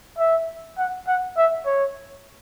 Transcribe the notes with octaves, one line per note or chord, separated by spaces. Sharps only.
E5
F#5
F#5
E5
C#5